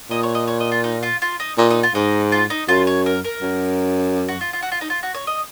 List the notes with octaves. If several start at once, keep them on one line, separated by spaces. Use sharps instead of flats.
A#2 D#5
C#5
D#5
C#5
D#5
F4
D#4
F4
F4
D#4
A#2 D#4
D#4
F4
G#2 D#4
F4
D#4
F#2 F4
C#5
A#4
A#4
F#2
F#4
F4
F4
F#4
F4
D#4
F4
F#4
C#5
D#5